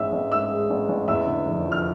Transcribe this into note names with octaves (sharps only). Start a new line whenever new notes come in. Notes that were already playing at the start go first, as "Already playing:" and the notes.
Already playing: A1 G#2 G#3 E5 E6
A1
G#2 E5 E6
G#3
A1
A1
E2 E5 E6
D3
F1
F3
F6